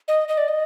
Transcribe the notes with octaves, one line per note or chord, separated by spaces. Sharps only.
D#5
D#5
D5
D#5